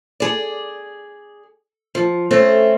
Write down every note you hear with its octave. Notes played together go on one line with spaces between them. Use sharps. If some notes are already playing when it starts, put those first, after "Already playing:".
G#4 D5
F3
A3 C4 C#4